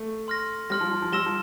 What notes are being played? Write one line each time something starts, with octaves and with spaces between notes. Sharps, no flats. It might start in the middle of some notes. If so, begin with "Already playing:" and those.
Already playing: A3
C6 F6 A#6
G3 C6 F6 A#6
F3
F3
F3
G3 C6 E6 A#6 E7 G7
F3